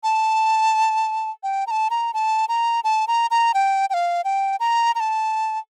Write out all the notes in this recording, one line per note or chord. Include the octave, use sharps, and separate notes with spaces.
A5
G5
A#5
A5
A#5
A5
A#5
A5
A#5
A#5
G5
G5
F5
G5
A#5
A#5
A5